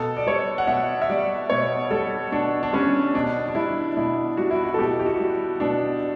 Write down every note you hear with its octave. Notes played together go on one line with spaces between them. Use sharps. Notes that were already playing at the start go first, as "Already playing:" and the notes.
Already playing: B2 A4
D5
G3 C#5
F#5
B2 E5
E5
G3 D5
B2 C#5
G3 A4
B2 D4
D4
G3 C#4
B2 D4
D4
G3 E4
B2 E4
G3 F#4
E4
F#4
A4
B2 G4
G4
F#4
G3
B2 D4